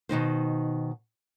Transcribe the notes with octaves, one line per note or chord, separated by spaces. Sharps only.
B2 D#3 D#4 C5